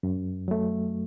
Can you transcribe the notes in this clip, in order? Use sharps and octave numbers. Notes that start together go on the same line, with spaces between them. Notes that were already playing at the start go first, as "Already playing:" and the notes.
F#2
F#3 A3